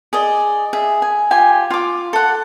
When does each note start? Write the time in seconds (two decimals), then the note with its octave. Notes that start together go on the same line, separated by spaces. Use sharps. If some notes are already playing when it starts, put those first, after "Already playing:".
0.13 G#4 D5 D#5
0.73 G#4 E5
1.02 G#5
1.31 F4 G4 G#5
1.70 F4 D6
2.13 A4 F#5